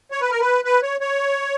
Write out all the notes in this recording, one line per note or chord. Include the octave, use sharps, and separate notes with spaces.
C#5
B4
A#4
B4
B4
C#5
C#5